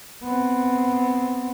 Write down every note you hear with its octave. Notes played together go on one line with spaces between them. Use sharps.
B3 C4